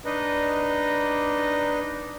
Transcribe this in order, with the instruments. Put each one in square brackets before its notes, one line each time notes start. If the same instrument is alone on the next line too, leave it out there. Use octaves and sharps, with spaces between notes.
[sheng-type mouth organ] D4 D#4 B4 D#5